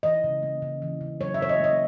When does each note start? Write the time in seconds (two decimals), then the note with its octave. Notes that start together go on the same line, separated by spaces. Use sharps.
0.03 E3 D#5
0.24 C#3
0.43 A#3
0.62 C#3
0.82 E3
1.01 C#3
1.20 F#3 C#5
1.34 E5
1.40 C#3 C#5
1.49 D#5
1.60 A#3 D#5